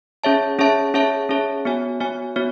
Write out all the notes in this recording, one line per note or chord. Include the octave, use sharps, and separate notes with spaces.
C#4 G#4 C#5 E5 A5
C#4 G#4 C#5 E5 A5
C#4 G#4 C#5 E5 A5
C#4 G#4 C#5 E5 A5
B3 F#4 C#5 G#5
B3 F#4 C#5 G#5
B3 F#4 C#5